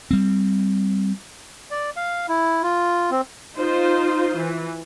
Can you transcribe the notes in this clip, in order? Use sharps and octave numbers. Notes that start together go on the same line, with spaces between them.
G3 C4
D5
F5
E4
F4
C4
D#4 F4 C5
E3